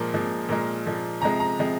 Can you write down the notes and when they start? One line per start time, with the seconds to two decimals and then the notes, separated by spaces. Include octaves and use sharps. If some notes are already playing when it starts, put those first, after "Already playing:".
Already playing: A#2 F3 G#3 A#4
0.14 A#2 F3 G#3
0.49 A#2 F3 G#3 A#4
0.86 A#2 F3 G#3
1.22 C3 F3 G#3 A#5
1.40 A#5
1.59 C3 F3 G#3